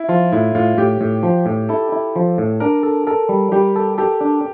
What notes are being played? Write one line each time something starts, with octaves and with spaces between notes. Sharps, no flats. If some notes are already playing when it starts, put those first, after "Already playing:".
Already playing: E4
F3 F4
A2 E4
A2 F4
A2 G4
A2
F3
A2
E4 A4
E4
F3
A2
D4 A#4
A4
A4 A#4
G3
G3 G4
A4
G4 A4
D4